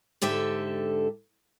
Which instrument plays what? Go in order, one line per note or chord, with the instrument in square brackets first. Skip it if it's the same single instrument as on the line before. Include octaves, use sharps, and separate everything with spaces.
[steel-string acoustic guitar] G#2 D3 G4 A4 E5